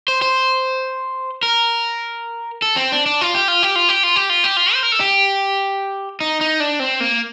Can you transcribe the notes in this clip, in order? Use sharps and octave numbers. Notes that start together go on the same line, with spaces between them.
C5
C5
A#4
A4
C4
D4
D4
F4
G4
F4
G4
F4
G4
F4
G4
F4
G4
F4
C5
A#4
A4
G4
D#4
D#4
D4
C4
A#3